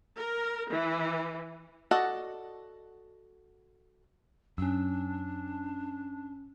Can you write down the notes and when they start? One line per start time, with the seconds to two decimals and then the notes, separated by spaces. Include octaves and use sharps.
0.18 A#4
0.70 E3
1.91 F#4 A4 D5 D#5 F#5
4.58 F#2 C#4 D4 E6